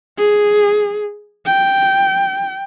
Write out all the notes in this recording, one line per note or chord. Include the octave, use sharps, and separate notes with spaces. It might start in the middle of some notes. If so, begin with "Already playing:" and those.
G#4
G5